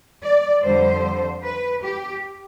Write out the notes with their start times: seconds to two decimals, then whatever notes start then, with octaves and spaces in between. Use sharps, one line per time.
0.22 D5
0.63 F2 D3 G3 C5
1.44 B4
1.83 G4